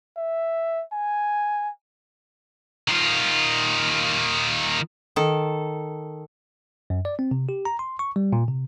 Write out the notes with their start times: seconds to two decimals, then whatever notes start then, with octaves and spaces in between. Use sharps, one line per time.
0.17 E5
0.93 G#5
2.88 D#3 F4
5.16 D#3 A4
6.90 F#2
7.05 D5
7.19 C4
7.31 C3
7.49 G4
7.65 A#5
7.79 C6
7.99 C#6
8.16 G3
8.33 A#2
8.48 C3